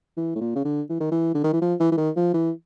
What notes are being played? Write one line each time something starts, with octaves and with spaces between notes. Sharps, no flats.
E3
A2
A#2
C#3
D3
E3
D#3
E3
D3
D#3
E3
F3
E3
E3
D#3
F3
E3